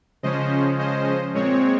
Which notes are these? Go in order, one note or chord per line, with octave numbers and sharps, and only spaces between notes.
C#3 F3 G#3 C#4 C5 D#5
C5 D#5
A#2 G#3 C4 C#5